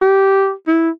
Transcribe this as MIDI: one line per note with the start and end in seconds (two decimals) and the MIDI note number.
0.02 0.52 67
0.68 0.90 64